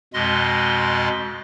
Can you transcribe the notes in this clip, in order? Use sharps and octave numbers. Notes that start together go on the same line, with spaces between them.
F2 B2 G#3 D#5 C6